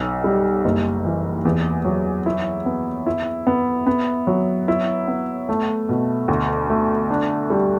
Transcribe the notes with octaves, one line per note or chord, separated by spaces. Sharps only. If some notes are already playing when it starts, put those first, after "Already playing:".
Already playing: B1 F#3
G3
F#1
E3
E2
F#3
E4
B3
E4
B3
B3
F#3
E4
B3
A3
B2
D2
A3
D4
G3